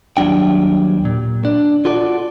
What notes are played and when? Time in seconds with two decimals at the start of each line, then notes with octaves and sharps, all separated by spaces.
0.17 D#2 F#3 G3 D4 G5
1.05 A#2
1.45 D4
1.85 F4 F#4 A4 D5